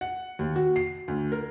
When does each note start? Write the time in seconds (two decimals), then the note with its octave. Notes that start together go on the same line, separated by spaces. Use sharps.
0.01 F#5
0.39 D#2
0.56 F#4
0.76 C7
1.08 D2
1.32 A#4